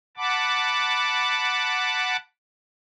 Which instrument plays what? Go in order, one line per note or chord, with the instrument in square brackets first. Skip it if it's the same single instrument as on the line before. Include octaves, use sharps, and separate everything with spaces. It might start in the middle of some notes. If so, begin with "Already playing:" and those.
[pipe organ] F#5 A5 B5 D6